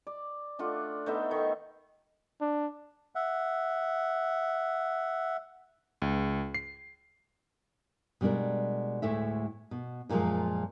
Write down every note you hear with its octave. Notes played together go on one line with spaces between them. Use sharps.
D5
A3 D4 F4 F#5
A3 B3 D#4 E5
D#3 C#6
D4
E5 F#5
C#2
C7
B2 G3 G#3 D4 A#4
D2 A2 G#3 A3 C#5 E5
B2
F#2 A#2 D#3 F3 G#3